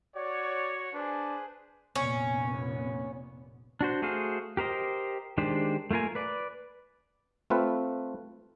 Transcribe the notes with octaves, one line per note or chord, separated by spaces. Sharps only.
F#4 C#5 D5
D4 G#4 B4 C5
F1 A#2 B3 C#4
D4 F#4 C5
A3 F#4 G#4 C5 F5
G4 A#4 C5 D#5
D#3 G#3 D4 G4 C5
A3 A#3 F4 A#4 G#5
B4 D5
A3 C4 F4 B4